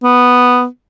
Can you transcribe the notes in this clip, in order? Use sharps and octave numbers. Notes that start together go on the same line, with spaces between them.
B3